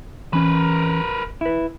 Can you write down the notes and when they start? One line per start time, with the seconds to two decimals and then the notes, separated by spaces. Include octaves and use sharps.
0.33 E3 C#4 A#4 B4 B5
1.41 E4 B4